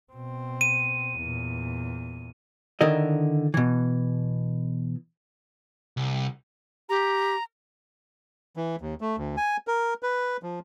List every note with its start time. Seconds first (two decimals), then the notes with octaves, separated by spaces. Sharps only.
0.13 B2 C4
0.61 D#7
1.17 E2 A#2
2.81 D3 D#3 E4 A#4 D#5
3.54 B2 E3
5.97 C2
6.89 G4 A#5
8.57 E3
8.81 D#2
9.01 A3
9.18 D2
9.37 G#5
9.67 A#4
10.03 B4
10.43 F3